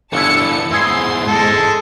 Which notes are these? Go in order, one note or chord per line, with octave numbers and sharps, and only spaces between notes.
G1 E3 D4 E4 A5 C#7
E2 G#2 E4 G#4 C6
G#3 A4